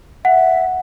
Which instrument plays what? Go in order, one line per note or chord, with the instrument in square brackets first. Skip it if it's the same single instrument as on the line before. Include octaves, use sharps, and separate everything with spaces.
[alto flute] E5 [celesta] F#5